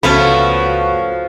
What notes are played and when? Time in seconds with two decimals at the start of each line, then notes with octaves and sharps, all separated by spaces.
0.03 C#2 F3 A3 B3 C#4 F#4 B5